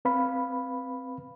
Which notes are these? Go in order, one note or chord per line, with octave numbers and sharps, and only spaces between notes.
C4 B4 F5 B5